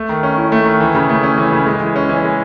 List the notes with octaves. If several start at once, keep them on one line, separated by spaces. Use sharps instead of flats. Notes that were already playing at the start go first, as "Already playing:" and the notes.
Already playing: A3
D#3
C#4
E4
A3
D#3
E3
C#3
A3
C#4
E3
C#3
G#3
E3
C#4
E3
G#3